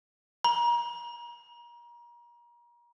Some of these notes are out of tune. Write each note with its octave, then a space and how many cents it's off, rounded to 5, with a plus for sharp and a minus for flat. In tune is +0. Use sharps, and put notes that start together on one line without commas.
A#5 +35